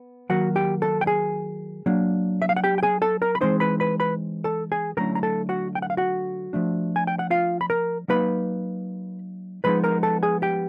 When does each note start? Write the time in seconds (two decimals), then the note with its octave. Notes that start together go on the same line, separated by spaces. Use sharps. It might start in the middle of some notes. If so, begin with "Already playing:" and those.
Already playing: B3
0.30 D#3 F#3 A#3 F#4 F#5
0.56 G4 G5
0.82 A4 A5
1.01 G5
1.07 G#4 G#5
1.86 F#3 A#3 D4
2.42 E5
2.49 F5
2.56 F#5
2.64 G4 G5
2.78 G5
2.83 G#4 G#5
3.02 A4 A5
3.22 A#4 A#5
3.35 B5
3.41 E3 G#3 C4 D#4 C5 C6
3.60 B4 B5
3.80 B4 B5
4.00 B4 B5
4.44 A4 A5
4.72 G#4 G#5
4.97 D3 F#3 A3 C#4 E4 A#4 A#5
5.15 A#5
5.23 A4 A5
5.49 F#4 F#5
5.75 G5
5.82 F#5
5.90 F5
5.97 F#4 F#5
6.53 F3 A3 D4
6.96 G#5
7.07 G5
7.19 F#5
7.30 F4 F5
7.61 B5
7.70 A#4 A#5
8.08 F#3 A#3 D#4 B4 B5
9.64 F3 G#3 B3 D#4 B4 B5
9.84 A#4 A#5
10.03 A4 A5
10.23 G#4 G#5
10.42 G4 G5